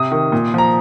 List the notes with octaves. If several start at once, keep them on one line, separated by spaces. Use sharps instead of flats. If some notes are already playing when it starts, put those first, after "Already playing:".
Already playing: C3 D#6
D#3
A#2
F3 A#5